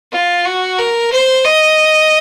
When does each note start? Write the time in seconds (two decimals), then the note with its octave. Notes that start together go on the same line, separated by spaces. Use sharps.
0.12 F4
0.46 F#4
0.79 A#4
1.12 C5
1.46 D#5